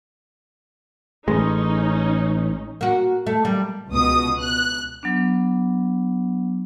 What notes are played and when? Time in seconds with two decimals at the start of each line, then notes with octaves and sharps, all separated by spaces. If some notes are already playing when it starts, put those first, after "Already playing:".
1.28 A1 G#3 C#4 D#4
2.81 A#3 F#4
3.27 A3
3.45 G3 A#3
3.91 C#2 B2 D#6
4.40 F#6
5.03 F#3 B3 D4